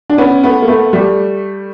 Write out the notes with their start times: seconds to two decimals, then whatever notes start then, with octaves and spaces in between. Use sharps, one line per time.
0.10 D4
0.18 B3 C#4
0.43 A3 B3
0.62 A#3
0.68 A3 B3
0.93 G3 A3